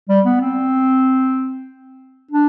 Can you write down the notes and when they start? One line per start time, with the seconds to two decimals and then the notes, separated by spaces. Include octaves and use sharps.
0.09 G3
0.25 B3
0.41 C4
2.31 D4